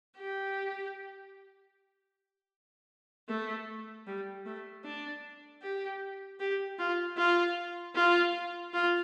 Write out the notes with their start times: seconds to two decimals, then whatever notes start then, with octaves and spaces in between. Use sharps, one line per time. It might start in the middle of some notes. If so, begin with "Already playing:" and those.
0.18 G4
3.29 A3
4.07 G3
4.46 A3
4.85 D4
5.62 G4
6.40 G4
6.78 F4
7.17 F4
7.95 F4
8.74 F4